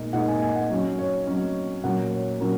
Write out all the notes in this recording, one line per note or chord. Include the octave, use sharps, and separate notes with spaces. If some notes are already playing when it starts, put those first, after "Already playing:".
Already playing: A#2 G#3 D#4 D#5
A#2 G#3 D#4 F#5
G#5
G#5
F#5
F#3 C#4 D#5
C#5
F#3 C#4
A#2 F#3 C#4 F#5
C#5
A#2 F#3 C#4 A#4